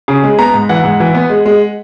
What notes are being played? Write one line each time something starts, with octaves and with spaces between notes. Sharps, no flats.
C#3
G#3
B3 A#5
G#2
E3 F#5
G#2
E3
B3
G#3
G#3